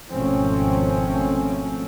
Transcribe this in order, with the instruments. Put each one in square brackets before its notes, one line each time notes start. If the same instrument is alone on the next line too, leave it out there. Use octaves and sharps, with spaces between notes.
[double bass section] G#1 B2 F3 A3 C4 C#4